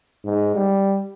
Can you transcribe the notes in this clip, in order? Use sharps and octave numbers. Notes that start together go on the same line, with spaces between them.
G#2
G3